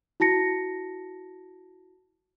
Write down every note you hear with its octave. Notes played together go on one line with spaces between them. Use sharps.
E4 F#4 A5 A#6 C#7